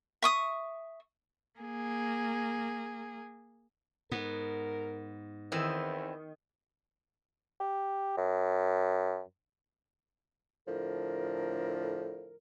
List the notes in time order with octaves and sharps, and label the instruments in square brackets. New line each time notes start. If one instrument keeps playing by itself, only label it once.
[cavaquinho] E5 C#6 D#6
[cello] A#3 G#4
[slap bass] G#2 [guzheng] B3 [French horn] A#4
[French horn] E2 [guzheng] D#3 [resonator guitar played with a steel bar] E3 C4
[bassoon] G4
F#2
[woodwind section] A2 D3 F3 A#4